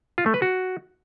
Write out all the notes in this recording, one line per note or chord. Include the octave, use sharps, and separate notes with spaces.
F4
A3
B4
F#4